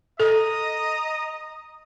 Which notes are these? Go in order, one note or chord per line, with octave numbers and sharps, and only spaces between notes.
A4 D#5 A#5 D#6